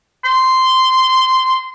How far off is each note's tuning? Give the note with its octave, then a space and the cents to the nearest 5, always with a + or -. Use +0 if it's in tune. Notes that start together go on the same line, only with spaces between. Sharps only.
C6 -10